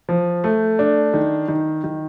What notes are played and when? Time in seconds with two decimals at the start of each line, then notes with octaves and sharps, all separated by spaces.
0.09 F3
0.44 A3
0.79 D4
1.14 D#3
1.48 D#3
1.84 D#3